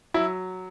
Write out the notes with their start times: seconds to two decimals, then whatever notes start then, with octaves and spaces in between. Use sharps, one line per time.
0.14 F#3 E4